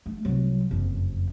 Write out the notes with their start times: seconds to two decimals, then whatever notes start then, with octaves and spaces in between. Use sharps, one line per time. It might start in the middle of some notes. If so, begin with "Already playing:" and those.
0.06 A3
0.25 C2 F#3
0.71 F#1 F2